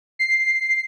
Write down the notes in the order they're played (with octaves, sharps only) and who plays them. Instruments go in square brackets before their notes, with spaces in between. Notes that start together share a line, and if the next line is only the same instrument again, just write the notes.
[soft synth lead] C7